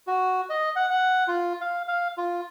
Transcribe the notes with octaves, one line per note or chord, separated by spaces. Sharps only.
F#4
D#5
F#5
F#5
F4
F5
F5
F4